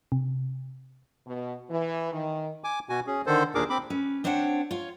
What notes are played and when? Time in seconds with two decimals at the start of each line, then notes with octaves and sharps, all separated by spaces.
0.12 C3
1.27 B2
1.70 E3
2.12 D#3
2.64 G#5 D6
2.89 B2 F#4 G#5
3.07 C#4 G#4
3.26 D3 D#3 A4 C5
3.55 D#2 A#2 D4 G#4 A#4 D6
3.70 C4 B5 D6
3.90 C#4 B4
4.24 C4 D4 C5 C#5 E5 F#5
4.71 F4 C#5